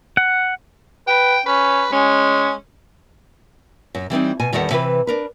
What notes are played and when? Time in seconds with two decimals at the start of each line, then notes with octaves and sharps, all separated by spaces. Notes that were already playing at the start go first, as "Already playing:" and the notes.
0.17 F#5
1.07 B4 G5
1.46 C#4 B4
1.92 G#3 C#4
3.95 F#2
4.10 E3 G3 C4 D#4
4.40 B2 G#5
4.53 E2 D#3 G3 E4 A4 F#5
4.71 C3 E3 E4 B4
5.07 D4 A#4 B4